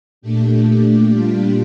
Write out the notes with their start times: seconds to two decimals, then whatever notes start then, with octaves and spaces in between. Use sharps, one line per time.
0.21 A#2 A3 D4 G4
1.11 A#2 G3 D4 F4